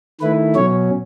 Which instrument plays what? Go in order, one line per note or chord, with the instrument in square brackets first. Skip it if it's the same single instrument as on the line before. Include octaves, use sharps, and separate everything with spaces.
[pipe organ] D#3 A3 E4 B4
B2 F#3 C#4 C#5